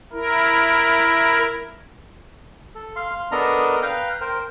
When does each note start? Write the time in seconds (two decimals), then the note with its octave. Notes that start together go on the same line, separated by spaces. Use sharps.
0.13 E4 A#4
2.75 A4
2.96 F5 C6
3.10 F5 C6
3.31 B3 D4 A4 A#4 D#5 A#5
3.82 B4 F5 G5 A#5
4.21 A#4 C5 G5